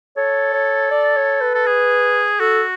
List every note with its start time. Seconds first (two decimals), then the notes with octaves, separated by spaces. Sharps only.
0.17 A4 C#5
0.54 C#5
0.91 D5
1.16 C#5
1.41 B4
1.55 A4
1.66 G#4
2.40 F#4 A4